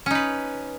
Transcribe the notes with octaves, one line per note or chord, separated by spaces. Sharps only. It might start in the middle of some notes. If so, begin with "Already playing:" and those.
C#4 D#4 B4